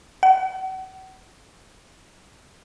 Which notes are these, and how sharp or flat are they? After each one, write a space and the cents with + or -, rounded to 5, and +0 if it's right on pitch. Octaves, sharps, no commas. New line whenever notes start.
F#5 +35